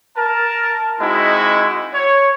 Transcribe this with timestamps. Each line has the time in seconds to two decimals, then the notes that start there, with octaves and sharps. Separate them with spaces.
0.16 A#4 A5
0.99 G#3 C4 D#4 E4 F#4
1.93 C#5